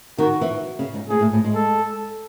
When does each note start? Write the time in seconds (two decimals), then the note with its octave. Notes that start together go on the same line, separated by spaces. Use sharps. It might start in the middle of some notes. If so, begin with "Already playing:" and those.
0.18 D#3 F#4
0.41 E3
0.79 C#3
0.94 G#2
1.09 A2 G#4
1.21 A2
1.33 A2
1.45 G#3
1.55 A4